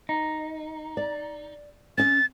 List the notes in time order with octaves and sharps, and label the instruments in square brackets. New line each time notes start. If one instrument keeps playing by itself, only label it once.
[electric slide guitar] D#4
[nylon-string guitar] D5
[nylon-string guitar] C#4 D#5 [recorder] A6